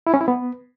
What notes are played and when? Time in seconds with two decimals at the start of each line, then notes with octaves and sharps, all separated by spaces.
0.07 E4
0.14 C#4
0.21 E4
0.28 B3